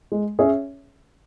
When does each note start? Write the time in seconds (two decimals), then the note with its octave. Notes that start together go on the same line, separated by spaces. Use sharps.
0.12 G#3
0.39 C#4 G#4 C#5 E5